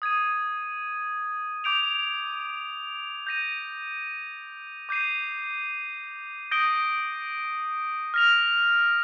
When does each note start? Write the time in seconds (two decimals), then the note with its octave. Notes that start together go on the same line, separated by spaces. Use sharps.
0.02 D#6 G#6 D#7
1.64 D6 G6 D7 F7
3.27 G6 A#6 D#7
4.89 D6 G6 C7 D#7
6.51 D#6 G6 A#6 D7 G7
8.14 F6 A#6 F7